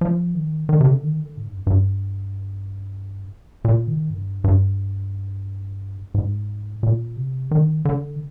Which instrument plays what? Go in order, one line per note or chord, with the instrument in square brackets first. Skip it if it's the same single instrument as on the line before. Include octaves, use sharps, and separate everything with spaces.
[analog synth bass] F3
D#3
D#3
C3
D3
D#3
D3
G#2
G2
F2
G2
A#2
D#3
G2
G2
G#2
A#2
C3
D#3
D3